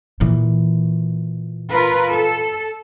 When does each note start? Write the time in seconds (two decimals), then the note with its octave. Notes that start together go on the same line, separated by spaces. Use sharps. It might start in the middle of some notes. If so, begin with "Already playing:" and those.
0.20 A#2 E3
1.70 F4 A#4 B4
2.09 A4